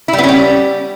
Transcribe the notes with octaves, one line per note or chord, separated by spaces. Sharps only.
E4
G3
B3
C#4
G3